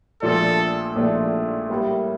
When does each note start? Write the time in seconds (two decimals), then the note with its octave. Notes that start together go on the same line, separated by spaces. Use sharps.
0.22 A#1 A#2 F3 A3 D4 A4
0.96 A#1 A#2 F3 A3 D4
1.70 A2 G3 A#3